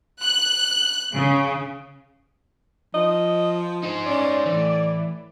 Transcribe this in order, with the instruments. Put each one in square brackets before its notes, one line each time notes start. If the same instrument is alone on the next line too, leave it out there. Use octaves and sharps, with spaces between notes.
[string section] F#6
C#3
[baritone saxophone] F3 [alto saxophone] D#5
[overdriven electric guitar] D#4 C5
[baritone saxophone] C#4 [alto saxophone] D5
[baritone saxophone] A2 [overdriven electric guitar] E3